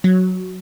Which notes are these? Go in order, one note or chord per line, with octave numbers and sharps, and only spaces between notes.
F#3